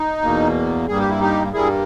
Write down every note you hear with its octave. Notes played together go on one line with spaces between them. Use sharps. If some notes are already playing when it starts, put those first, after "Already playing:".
Already playing: D#4
E2 B2 A#3
G2 G3 A#3 G#4
G4
E4
D#4 G4
G2 G3 A#3 E4 G#4